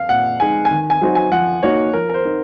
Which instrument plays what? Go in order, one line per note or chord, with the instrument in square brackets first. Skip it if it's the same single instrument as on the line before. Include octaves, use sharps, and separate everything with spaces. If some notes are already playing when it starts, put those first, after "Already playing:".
Already playing: [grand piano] F5
[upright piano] A#2 [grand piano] F#5
[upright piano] G#3 D#4 [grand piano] G#5
[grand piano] G#5
[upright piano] D#3
[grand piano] G#5
[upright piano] F#3 C4 D#4 F#4
[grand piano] G#5
[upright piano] F3 [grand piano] F#5
[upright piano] A#3 D#4 F#4 [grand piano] C#5
[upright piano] F3 [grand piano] A#4
[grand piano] A#4
C5
[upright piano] C4 D#4